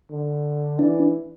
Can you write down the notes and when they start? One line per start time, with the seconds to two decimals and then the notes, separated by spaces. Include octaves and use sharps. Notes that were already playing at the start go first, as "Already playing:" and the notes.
0.11 D3
0.79 E3 D4